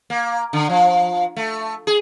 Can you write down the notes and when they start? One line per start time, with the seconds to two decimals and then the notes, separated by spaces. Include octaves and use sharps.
0.10 A#3
0.53 D3
0.69 F3
1.37 A3
1.87 G#4